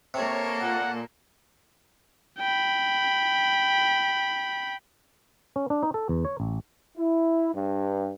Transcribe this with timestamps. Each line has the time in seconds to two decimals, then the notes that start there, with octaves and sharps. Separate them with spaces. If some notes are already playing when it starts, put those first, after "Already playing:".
0.14 C3 A#3 A4 C#5
0.61 A#2 F#5
2.39 G5 B5
5.56 C#4
5.70 D4
5.83 D#4
5.94 A4
6.09 E2
6.25 C#5
6.40 A1
6.96 E4
7.53 G2